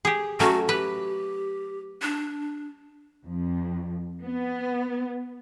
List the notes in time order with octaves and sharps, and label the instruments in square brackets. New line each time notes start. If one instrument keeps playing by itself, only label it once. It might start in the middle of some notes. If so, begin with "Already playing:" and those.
[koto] G4 G#4
[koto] F#3 A3 C#4 [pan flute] F#4
[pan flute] G4 [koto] B4
[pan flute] D4
[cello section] F2
B3